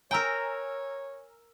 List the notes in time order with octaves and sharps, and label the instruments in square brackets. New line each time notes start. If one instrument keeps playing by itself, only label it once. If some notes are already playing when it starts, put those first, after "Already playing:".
[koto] A#4 G5 [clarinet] C#5 [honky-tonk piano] G#5 A#5 E6